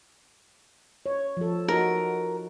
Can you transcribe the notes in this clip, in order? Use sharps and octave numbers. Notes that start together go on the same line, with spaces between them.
C#5
F3 A4
D#4 F#4 A#4